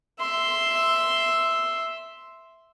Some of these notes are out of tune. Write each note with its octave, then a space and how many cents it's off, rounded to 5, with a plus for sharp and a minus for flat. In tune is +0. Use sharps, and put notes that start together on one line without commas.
E5 +0 C6 +0